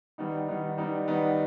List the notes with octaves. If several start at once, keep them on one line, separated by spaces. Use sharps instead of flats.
D#3 G3 B3 D#4
D#3 G3 B3 D#4
D#3 G3 B3 D#4
D#3 G3 B3 D#4